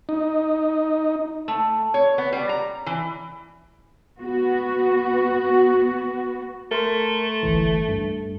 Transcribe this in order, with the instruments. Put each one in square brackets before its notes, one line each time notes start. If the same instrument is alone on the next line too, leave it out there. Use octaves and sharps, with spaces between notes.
[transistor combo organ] D#4
[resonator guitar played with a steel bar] A3
C#5
B3
G3
A#5
E3
[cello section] B3 F#4
[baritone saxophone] A3 [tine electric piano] A#4 A#5 C6
[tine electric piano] G1 C2 E3
G2